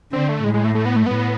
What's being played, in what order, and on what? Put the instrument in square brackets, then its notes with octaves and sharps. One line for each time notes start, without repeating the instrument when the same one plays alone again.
[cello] D3 [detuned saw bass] C4
[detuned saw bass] A3
[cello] A2 [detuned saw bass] G#3
[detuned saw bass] G#3
A3
A3
B3
A3
[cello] A2 [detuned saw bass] B3